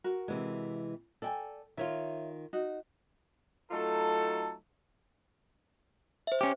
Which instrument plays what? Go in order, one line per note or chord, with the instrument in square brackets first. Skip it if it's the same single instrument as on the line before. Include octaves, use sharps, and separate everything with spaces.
[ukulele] F#4 A#4
[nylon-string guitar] C3 E3 G#3
[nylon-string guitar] A4 [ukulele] D5 G5 G#5
[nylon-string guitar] D#3 F4 [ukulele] C#5 E5
[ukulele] D#4 F#4
[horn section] F#3 A3 D#4 F4 A4
[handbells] C5 E5
[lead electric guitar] C#4 G4